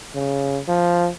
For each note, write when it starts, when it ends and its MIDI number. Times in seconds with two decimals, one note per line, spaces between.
0.15 0.58 49
0.68 1.09 53